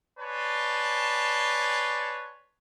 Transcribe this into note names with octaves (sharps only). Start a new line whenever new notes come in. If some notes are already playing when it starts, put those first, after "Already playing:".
B4 C#5 D5 G#5 A5 C6